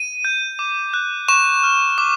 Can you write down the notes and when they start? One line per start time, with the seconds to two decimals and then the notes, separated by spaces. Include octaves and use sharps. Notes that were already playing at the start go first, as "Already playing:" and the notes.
Already playing: D#7
0.25 G6
0.59 D6
0.94 F#6
1.29 C#6 E7
1.63 F6
1.98 D6